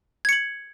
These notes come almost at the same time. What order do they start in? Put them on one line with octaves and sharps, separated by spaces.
G#6 C#7 F#7